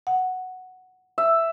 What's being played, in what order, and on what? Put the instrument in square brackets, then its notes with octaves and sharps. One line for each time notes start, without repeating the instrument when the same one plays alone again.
[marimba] F#5
[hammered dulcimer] E5